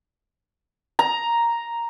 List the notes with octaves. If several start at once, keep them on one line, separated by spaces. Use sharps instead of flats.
A#5